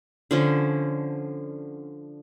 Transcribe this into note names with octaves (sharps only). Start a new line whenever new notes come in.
D3 F3 C#4